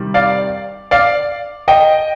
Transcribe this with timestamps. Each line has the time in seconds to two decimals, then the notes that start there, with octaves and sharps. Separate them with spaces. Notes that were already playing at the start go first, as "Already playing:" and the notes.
Already playing: C3 D#3 G3
0.14 D5 F5
0.91 D5 F5
1.68 D#5 G5